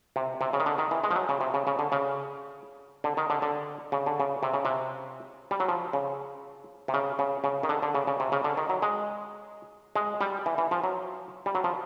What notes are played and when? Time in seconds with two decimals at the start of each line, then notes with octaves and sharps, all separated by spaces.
0.16 C3
0.41 C3
0.53 C#3
0.60 D#3
0.66 D3
0.78 D#3
0.91 E3
1.03 G#3
1.11 F3
1.16 F#3
1.29 C#3
1.41 C3
1.54 C#3
1.67 C#3
1.79 D3
1.92 C#3
3.04 D3
3.17 D#3
3.30 D3
3.42 D3
3.92 C#3
4.06 D3
4.20 C#3
4.43 C3
4.54 C#3
4.65 C3
5.51 G3
5.60 F#3
5.68 F3
5.93 C#3
6.88 C3
6.94 C#3
7.19 C#3
7.44 C#3
7.63 D#3
7.69 D3
7.82 D3
7.95 C#3
8.07 C#3
8.20 C3
8.32 C#3
8.44 D3
8.57 D#3
8.69 F#3
8.82 G#3
9.96 G#3
10.21 G3
10.46 E3
10.58 E3
10.71 F3
10.84 F#3
11.46 G3
11.55 F#3
11.64 F3